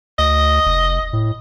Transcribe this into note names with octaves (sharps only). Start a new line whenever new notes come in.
D2 D#5
F1
A2